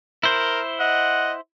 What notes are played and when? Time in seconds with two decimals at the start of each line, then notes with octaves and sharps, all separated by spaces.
0.23 E4 A#4 C5
0.80 D#5 F#5